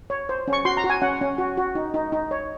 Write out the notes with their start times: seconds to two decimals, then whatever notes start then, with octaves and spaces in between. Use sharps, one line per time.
0.10 C#5
0.29 C5
0.48 C#4
0.53 C#6
0.65 F#4 C6
0.77 A#5
0.84 F#4
0.90 G#5
1.02 C#4 F#5
1.21 C#4
1.38 F#4
1.57 F#4
1.75 D#4
1.94 D#4
2.12 D#4
2.31 C#5